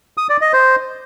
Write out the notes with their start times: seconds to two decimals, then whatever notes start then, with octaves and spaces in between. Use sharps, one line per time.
0.18 D#6
0.29 D5
0.41 D#5
0.53 C5